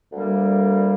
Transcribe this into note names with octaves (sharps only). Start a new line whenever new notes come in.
D2 D3 G3 A#3